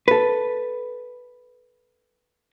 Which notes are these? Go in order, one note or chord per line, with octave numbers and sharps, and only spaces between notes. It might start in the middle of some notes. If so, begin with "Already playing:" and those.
A4 B4